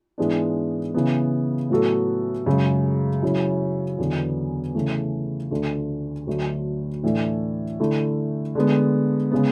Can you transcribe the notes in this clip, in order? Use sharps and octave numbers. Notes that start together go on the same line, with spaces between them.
G#2 E3 G#3 B3 D4
C#3 E3 B3
A2 F#3 B3 F#4 A4
F#2 C#3 G#3
F#2 C#3 F#3 C#4 E4
E2 D3 F#3 B3
C#3 E3 A3
D2 D3 A3
D2 D3 F#3 A3
A2 E3 A3 D4
D3 A3 E4
D3 G#3 B3
C#3 G#3 B3